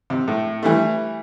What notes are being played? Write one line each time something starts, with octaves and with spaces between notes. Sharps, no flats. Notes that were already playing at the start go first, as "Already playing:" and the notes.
C3
A2
E3 G3 A3